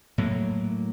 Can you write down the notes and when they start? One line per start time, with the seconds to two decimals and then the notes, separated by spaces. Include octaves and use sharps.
0.18 A2 F#3 A#3